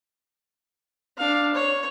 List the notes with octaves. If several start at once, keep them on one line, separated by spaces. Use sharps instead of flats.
D4 F5
C#5